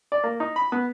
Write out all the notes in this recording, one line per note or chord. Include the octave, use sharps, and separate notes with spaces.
D5
A#3
D#4
B5
B3